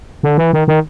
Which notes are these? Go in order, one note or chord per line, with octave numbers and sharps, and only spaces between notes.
D3
E3
D#3
D#3